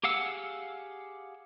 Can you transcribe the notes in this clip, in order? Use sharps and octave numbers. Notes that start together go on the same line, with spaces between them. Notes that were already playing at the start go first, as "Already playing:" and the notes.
G4 G#4 F5 F#5 E6